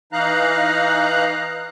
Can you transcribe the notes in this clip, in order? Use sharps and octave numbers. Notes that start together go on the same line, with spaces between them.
E3 D#4 F5 A#5 F#6